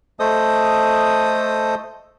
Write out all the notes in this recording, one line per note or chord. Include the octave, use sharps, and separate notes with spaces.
A3 A4 C5 D#5 D#6